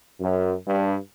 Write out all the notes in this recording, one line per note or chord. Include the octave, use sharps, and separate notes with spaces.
F#2
G2